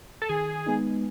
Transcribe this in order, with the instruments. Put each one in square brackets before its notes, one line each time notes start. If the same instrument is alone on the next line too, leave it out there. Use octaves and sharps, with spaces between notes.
[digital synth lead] A4
[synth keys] D#3 [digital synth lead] G#4
[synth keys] G#3 B3 D#4